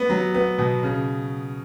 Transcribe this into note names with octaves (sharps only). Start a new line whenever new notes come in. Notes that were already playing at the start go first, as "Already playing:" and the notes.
Already playing: B3
F#3
B3
B2
C#3